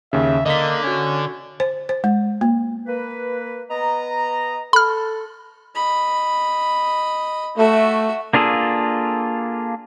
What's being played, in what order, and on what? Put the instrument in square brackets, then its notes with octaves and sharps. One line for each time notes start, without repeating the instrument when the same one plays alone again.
[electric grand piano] D#2 C#3 [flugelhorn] E5
[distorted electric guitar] D3 [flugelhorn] A#3 [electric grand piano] D#5 B6
[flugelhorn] C#4 [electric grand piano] F#4 G#6
[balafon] C5
C5
G#3
A#3
[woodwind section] A#3 B4
B3 D#5 A#5
[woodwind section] A4 [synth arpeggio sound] B5 F6
[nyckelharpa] D#5 B5
[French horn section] A3 [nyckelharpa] F#4 E5
[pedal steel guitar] A#3 D4 F4 G#4 A4